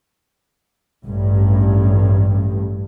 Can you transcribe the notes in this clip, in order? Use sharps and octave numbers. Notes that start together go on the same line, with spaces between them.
A1 G2